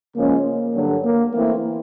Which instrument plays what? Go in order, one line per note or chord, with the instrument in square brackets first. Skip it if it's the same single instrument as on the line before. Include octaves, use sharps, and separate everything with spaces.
[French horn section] C#3 F3 G#3 C#4 [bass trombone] A#3
[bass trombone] A#3
[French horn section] G2 D3 F#3
[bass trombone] A#3
[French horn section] E3 A3 C4 E4 [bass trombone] A#3